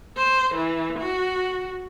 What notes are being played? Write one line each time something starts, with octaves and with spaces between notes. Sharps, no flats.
C5
E3
F#4